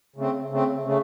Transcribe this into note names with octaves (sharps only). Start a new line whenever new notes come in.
C#3 A3 C4
C#3 A3 C4
C#3 A3